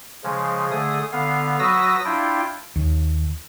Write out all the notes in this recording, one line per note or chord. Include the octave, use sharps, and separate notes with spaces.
C#3 F3 G#3
D3 A3 G#4 D#6
D3 B3 F5
F#3 F#4 B4 D#6 E6 A#6
D4 E4 F4 G5
D#2